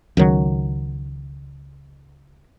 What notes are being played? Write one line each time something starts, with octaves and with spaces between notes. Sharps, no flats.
C#2 D#3 F#3